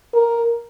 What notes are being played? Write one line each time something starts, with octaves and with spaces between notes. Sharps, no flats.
A#4